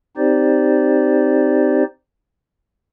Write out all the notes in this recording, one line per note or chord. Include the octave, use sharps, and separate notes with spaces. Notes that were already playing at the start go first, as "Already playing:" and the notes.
C4 D#4 G4 C5 D5